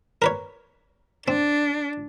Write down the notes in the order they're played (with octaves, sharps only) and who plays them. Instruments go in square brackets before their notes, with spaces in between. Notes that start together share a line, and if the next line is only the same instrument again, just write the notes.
[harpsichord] A#4 B4 C#5
[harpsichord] C4 [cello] D4